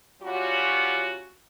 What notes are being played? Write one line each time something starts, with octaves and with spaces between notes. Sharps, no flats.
F#3 G3 C#4 F4 F#4